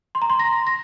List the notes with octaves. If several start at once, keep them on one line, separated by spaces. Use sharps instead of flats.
C6
A#5
C6
A#6
A#6